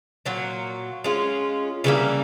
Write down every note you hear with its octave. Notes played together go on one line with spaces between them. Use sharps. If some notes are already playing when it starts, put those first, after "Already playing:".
A#2 F#3 A#3
G#3 C#4 F4
C#3 E3 G3 A#3